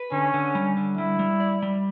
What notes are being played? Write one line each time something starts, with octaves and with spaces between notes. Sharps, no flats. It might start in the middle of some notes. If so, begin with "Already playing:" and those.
Already playing: B4
D3 C#4
D3
G3
D3
G3 E4
G3
D5
G3